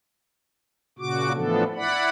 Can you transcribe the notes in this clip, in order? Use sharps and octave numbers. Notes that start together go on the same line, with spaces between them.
A#2 C#3 F#4 D6
A2 E3 F3 B3 D4 A4
E4 D5 F#5 B5